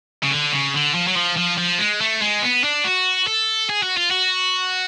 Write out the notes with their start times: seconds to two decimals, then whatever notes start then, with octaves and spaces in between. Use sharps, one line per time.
0.23 C#3
0.31 D3
0.52 C#3
0.74 D3
0.94 F3
1.07 F#3
1.16 F3
1.37 F3
1.58 F3
1.79 G#3
2.01 A3
2.21 G#3
2.42 B3
2.64 D4
2.85 F#4
3.27 A4
3.70 G#4
3.83 F#4
3.97 F4
4.11 F#4